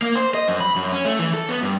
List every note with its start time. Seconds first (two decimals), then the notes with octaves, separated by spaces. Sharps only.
0.02 A#3
0.15 C5
0.34 D#5
0.48 F#2
0.60 B5
0.76 F#2
0.92 C#4
1.05 A3
1.19 E3
1.34 A4
1.49 B3
1.63 G2